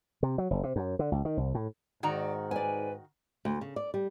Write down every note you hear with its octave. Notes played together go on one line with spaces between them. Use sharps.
C3
F#3
F#1
C3
F#2
D3
C#2
D#3
C2
A2
G#2 D#3 F#4 D5 A#5
B4 D5 G#5
D2
C#3
D5
G3